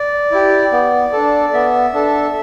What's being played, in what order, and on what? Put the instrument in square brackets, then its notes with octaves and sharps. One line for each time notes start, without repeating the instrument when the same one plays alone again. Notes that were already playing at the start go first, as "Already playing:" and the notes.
Already playing: [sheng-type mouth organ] D5
E4 G4
B3
D4 A4
B3 E5
D4 A4